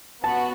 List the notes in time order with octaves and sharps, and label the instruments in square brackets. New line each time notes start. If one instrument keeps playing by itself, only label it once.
[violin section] B3 F#4 [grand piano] A5